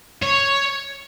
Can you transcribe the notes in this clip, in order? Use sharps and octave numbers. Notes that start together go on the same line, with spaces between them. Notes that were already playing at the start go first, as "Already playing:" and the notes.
C#5